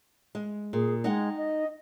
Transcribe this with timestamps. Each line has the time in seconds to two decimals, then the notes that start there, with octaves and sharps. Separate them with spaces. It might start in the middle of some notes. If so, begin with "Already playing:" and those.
0.35 G#3
0.73 A#2 G#4
1.04 G#3 D#4 F#5 G5
1.37 D#5